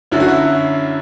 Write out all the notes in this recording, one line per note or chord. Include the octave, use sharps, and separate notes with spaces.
F#2 D3 F#3 E4
F#4
E4